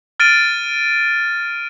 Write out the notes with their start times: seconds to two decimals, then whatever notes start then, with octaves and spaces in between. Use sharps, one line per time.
0.20 F6 A6 D7 D#7